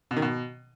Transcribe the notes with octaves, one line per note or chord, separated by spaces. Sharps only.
B2
D#3
B2